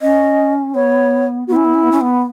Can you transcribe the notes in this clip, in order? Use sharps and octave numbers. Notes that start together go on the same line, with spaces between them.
C#4 D#5
B3 C#5
B3 F#4
C#4 E4
B3
C#4
B3
C#4
B3